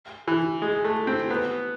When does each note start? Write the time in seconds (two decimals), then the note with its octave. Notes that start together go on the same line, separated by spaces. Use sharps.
0.28 E3
0.62 G#3
0.85 A3
1.07 C4
1.31 B3